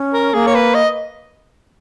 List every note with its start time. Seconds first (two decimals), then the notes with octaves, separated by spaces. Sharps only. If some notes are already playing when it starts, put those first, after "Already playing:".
Already playing: C#4
0.14 A#4
0.34 A#3 G#4
0.47 C#5
0.54 B4
0.74 D#5